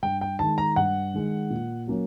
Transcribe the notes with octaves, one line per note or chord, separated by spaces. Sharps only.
G2 G5
G5
D#3 G#3 A5
A#5
G2 F#5
D#3 G#3
A#2
F#3 A#3 C#4